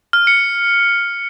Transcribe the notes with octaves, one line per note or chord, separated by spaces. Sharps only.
F6
C#7